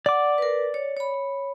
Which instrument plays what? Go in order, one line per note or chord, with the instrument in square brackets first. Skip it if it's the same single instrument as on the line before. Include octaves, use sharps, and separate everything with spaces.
[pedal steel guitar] D5 D6 [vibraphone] F#5
[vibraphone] A#4 B4
C#5
C#5 B5